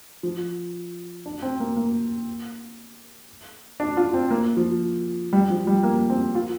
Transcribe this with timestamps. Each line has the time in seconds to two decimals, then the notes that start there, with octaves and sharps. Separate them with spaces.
0.23 F3
1.26 D4
1.42 C4
1.60 A#3
1.76 A#3
3.80 D4
3.97 F4
4.14 C4
4.30 A#3
4.57 F3
5.33 G3
5.50 F3
5.67 G3
5.83 A#3
6.10 C4
6.35 F4